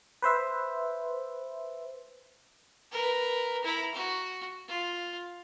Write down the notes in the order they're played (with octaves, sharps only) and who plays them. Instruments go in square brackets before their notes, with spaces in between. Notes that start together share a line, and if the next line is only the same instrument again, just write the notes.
[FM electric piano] B4 C5 E5
[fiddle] A#4 B4
E4 A#5
F#4
F4